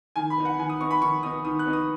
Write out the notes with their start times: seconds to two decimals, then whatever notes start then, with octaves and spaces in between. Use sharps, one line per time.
0.16 D#3 G#5
0.30 B5
0.38 B3 D#4
0.45 F#5
0.59 D#3 G#5
0.70 D#6
0.81 B3 D#4 C#6
0.91 B5
1.02 D#3 C#6
1.23 B3 D#4 D#6
1.45 D#3 D#6
1.59 F#6
1.66 B3 D#4
1.73 D#6